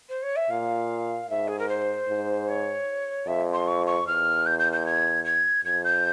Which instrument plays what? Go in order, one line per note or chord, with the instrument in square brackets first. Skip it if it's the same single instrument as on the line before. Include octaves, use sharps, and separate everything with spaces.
[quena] C5
C#5
E5
[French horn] A#2 [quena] F5
[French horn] G#2 [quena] E5
[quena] G#4
A#4
C5
[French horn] G#2
[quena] C#5
[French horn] F2 [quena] E5
[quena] C6
C#6
C#6
[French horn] E2 [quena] F6
[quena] G6
G6
G6
G#6
G#6
[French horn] F2 [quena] G#6
[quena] G6